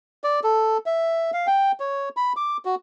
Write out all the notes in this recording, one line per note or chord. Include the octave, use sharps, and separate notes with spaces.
D5
A4
E5
F5
G5
C#5
B5
D6
F#4